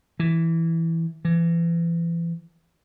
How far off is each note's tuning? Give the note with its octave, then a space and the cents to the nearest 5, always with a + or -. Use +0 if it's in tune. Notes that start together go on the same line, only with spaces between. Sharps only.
E3 +0
E3 +35